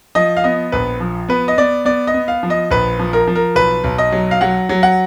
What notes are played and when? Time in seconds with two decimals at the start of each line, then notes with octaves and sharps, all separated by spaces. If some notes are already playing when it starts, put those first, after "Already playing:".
0.15 F3 D#5
0.37 F5
0.44 B3 D#5
0.72 A#1 B4
1.00 F3
1.28 B3 B4
1.48 D#5
1.58 B3 D5
1.85 B3 D5
2.07 D#5
2.14 B3
2.28 F5
2.43 F3
2.50 D#5
2.71 A#1 B4
2.99 F3
3.13 A#4
3.27 F3
3.35 A#4
3.55 B1 B4
3.84 B1
3.98 D#5
4.12 F#3
4.31 F5
4.41 F#3 F#5
4.69 F#3
4.83 F#5